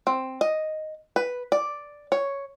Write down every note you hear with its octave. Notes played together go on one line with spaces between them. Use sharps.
C4
D#5
B4
D5
C#5